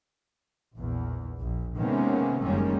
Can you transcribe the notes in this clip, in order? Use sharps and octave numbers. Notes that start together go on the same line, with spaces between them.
A#1 E2
A#1
C3 D#3 G#3 A#3 B3 C#4
F#1 D#3 G3 G#3 A#3 C#4